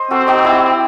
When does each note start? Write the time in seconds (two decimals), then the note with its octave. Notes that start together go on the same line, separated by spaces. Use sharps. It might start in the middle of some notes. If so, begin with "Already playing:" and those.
Already playing: C5 D#5
0.11 C4 F#4 A4
0.27 D#4 F#4
0.44 E4 G4